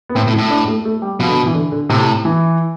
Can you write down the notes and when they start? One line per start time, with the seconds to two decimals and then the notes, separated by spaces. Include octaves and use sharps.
0.09 B3
0.15 A2 C4
0.27 A2
0.33 E4
0.38 A2
0.50 D4
0.68 A3
0.85 A3
1.02 G3
1.20 B2 F3
1.28 D3
1.46 E3
1.55 D3
1.72 D3
1.89 A2 C3
2.25 E3